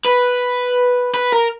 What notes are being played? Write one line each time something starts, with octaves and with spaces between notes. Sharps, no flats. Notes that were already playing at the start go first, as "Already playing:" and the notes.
B4
B4
A#4